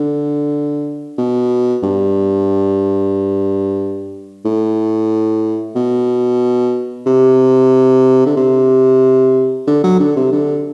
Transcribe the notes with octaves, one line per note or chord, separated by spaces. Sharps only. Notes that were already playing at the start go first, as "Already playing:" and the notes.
Already playing: D3
B2
G2
A2
B2
C3
D3
C3
D3
F#3
D3
C3
D3